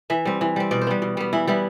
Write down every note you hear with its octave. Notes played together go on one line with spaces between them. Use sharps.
E3 E5
G3 C4
E3
G3 C4
B2 D5
C5
G3 B3
B2
G3 B3
E3 E4
G3 B3 E4